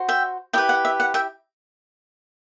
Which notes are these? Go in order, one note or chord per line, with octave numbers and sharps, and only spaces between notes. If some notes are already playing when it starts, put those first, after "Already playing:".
Already playing: F#4 C5
E5 G5
E4 G4 B4 E5 G5
F#5
E5
F#5
E5 G5